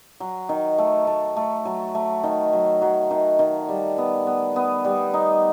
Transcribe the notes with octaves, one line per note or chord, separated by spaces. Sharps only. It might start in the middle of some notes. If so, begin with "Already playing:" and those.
F#3
D#3
A3
A3
A3
F#3
A3
D#3
F#3
F#3
D#3
D#3
G3
B3
B3
B3
G3
D#4